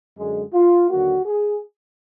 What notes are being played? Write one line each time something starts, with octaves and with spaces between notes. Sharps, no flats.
F#2 D3 G#3
F4
D#2 D3 F#3 A#3 F#4
G#4